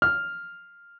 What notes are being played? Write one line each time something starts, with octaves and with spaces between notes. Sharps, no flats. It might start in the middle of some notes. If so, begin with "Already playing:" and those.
F6